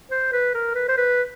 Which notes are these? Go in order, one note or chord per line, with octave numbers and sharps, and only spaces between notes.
C5
B4
A#4
B4
C5
B4